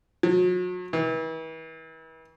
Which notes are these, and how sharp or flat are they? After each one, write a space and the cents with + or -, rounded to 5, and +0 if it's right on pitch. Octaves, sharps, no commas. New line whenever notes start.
F#3 -40
E3 -40